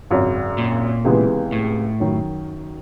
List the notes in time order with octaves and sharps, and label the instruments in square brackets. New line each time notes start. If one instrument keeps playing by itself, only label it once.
[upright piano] G#1 F#2 C#3
[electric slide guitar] A#2
[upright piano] C#2 C3 E3 G#3 B3
[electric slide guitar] A2
[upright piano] F#2 D#3 F#3